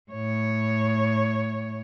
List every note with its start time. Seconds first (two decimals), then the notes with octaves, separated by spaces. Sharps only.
0.11 A2 C#5